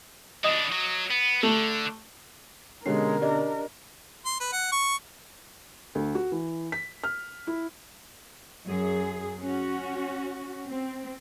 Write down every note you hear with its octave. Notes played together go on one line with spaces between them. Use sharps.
E3 D4 D#5
F#3
B3
D3 A3
B2 D3 G#3 C#4 G4 A#4 C#5 C7
D4 G4 D5 D#5
C6
B4
F#5
C#6
D2
F#4
E3
B6
F6
E4
F#2 G#4
C#4 F#4
C4